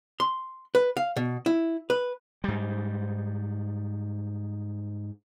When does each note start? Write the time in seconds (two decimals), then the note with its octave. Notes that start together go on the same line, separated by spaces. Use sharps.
0.20 C6
0.75 B4
0.97 F5
1.16 B2
1.46 E4
1.90 B4
2.44 G#2 G3